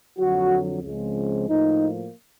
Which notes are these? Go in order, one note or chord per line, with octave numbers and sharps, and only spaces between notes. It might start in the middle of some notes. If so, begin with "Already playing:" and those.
F2 D3 F#3 F#4
C#2 C#3 F3 G#3 C4
A2 F3 A#3 D#4